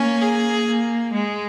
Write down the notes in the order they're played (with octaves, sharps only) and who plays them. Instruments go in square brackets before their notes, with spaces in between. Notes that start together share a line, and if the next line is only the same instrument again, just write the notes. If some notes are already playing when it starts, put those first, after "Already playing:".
Already playing: [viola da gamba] A#3 [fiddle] C#4
[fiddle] G#4
[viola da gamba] A#3
G#3